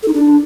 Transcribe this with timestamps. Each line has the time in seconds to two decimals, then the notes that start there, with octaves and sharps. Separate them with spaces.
0.03 A4
0.08 D#4
0.13 D4